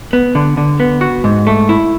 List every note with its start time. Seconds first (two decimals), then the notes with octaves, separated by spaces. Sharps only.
0.13 B3
0.35 D3
0.57 D3
0.80 B3
1.01 F#4
1.24 G#2
1.47 A3
1.69 E4